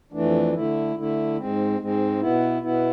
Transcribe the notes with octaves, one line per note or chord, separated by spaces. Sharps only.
F2 E3 A3 D4
D3 A3 E4
D3 A3 E4
G#2 G#3 C4
G#2 G#3 C4
B2 B3 E4
B2 B3 E4